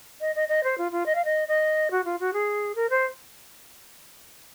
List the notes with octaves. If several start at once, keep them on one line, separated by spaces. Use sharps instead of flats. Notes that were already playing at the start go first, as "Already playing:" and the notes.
D#5
D#5
D#5
C5
F4
F4
D#5
F5
D#5
D#5
F#4
F4
F#4
G#4
A#4
C5